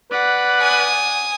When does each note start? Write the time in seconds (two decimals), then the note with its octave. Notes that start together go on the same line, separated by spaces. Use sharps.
0.11 B4 D5 F#5
0.61 G#5 D#6